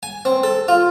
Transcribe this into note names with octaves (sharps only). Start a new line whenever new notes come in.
G#5
C4
A4
F4